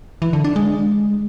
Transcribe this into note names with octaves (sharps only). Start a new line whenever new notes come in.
E3
D3
D4
G#3